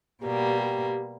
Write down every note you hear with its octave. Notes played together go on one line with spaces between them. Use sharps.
B2 G3 A#3 G4
G4